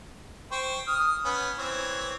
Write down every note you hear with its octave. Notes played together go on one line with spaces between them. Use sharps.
C5 G5 C#6
D#6 F6
B3 C#4
E3 C4 C#5